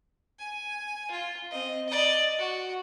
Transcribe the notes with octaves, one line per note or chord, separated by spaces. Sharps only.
G#5
F4
C4 D#5
D5 D#5
F#4